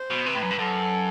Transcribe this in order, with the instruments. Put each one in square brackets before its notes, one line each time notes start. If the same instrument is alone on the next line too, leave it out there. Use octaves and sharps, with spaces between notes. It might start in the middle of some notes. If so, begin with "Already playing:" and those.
Already playing: [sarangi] C5
[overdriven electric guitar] B2
[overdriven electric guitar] C3 [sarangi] B4
[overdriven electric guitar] A2
F#2
G2
[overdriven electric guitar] F#2 [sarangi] A4